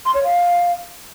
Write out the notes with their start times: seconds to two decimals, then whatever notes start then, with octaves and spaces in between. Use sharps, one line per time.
0.05 C6
0.14 C#5
0.23 F5